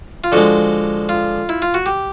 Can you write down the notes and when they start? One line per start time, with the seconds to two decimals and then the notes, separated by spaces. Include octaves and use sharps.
0.24 F4
0.32 D3 F3 G#3 F#4
1.09 F4
1.49 E4
1.62 F4
1.74 F#4
1.86 G4